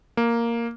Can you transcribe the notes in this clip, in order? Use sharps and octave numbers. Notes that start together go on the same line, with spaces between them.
A#3